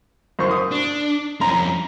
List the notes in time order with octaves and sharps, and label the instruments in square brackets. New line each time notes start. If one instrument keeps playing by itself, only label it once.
[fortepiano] F#2 C5 C#6
D#6
[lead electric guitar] D4
[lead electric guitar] F2 C#4 [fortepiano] A#5